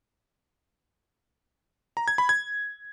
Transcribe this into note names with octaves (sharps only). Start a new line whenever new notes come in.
A#5
G#6
B5
G#6